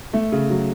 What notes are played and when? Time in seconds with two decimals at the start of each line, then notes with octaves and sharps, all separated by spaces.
0.13 A3
0.32 C#3
0.50 F#3